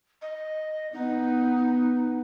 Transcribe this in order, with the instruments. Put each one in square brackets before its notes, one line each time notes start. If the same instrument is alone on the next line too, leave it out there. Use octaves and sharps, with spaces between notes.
[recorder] D#5
[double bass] B3 [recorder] D#4